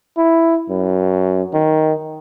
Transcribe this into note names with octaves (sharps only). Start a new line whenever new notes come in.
E4
F#2
D#3